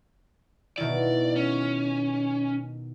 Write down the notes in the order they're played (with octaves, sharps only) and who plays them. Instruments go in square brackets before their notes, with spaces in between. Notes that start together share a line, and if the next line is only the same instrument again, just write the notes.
[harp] B2 D#3 E4 [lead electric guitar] D5
[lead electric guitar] C#4